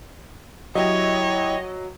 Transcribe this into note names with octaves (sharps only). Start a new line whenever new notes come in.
F#3 E4 G4 C#5 D#5